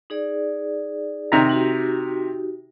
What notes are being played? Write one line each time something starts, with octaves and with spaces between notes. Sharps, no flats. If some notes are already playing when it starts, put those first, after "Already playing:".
D#4 G#4 D5
C3 D#3 A#5
D#4 F#4 G4